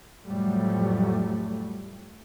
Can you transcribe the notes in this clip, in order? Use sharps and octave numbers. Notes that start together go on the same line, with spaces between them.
F2 A2 F#3 G3 A3